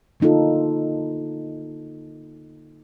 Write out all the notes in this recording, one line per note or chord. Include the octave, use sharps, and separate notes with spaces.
D3 A#3 D#4 F4 A4